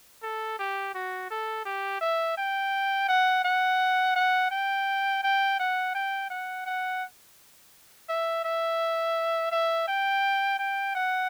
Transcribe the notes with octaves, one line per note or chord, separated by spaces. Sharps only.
A4
G4
F#4
A4
G4
E5
G5
F#5
F#5
F#5
G5
G5
F#5
G5
F#5
F#5
E5
E5
E5
G5
G5
F#5